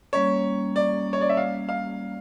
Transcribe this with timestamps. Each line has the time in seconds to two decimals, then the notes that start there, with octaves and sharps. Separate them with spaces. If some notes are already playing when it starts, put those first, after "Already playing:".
0.13 G3 A#3 C#4 C#5
0.76 D5
1.13 C#5
1.21 D5
1.29 E5
1.37 F5
1.69 F5